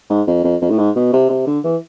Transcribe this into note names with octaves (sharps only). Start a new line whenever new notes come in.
G#2
F2
F2
F2
A2
G#2
B2
C3
C3
D3
E3